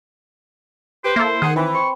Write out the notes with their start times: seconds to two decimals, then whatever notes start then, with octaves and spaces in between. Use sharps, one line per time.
1.05 G4 B4 C5
1.16 A#3 E4 A4
1.42 D#3 G#4 F#5
1.56 E3 C4 B4 C#6
1.75 C5 C#6